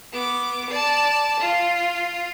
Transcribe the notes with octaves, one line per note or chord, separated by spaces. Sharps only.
B3 D6
D5 A5
F4